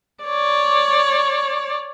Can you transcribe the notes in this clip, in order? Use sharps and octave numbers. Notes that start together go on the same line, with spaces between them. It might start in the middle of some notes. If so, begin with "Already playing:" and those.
C#5 D5